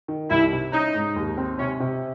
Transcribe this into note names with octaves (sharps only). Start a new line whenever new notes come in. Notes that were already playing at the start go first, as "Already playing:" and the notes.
D#3
C2 E4
C3
C#4 D#4
G#2
D#2
C4
C3 C#4
C3